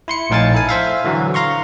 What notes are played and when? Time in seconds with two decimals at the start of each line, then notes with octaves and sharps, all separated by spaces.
0.08 E4 C6 C#7
0.30 A#1 A2 D#4 F5 G#5 A6
0.54 E4 A4 G#5
0.69 C5 E5 F5
1.04 D3 E3 F#3
1.34 F5 A#5 C6 C#6